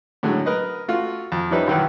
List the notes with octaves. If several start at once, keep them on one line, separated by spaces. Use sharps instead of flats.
A2 D3 F#3 G#3
A#4 B4 D#5
A3 F4 F#4
F2
F3 G3 C#4 D#4 B4 E5
B1 F#2 D#3 E3 B4